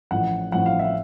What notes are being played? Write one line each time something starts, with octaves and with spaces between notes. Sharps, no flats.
A1 A2 F3 F#5
A1 A2 F3 F#5
F5
E5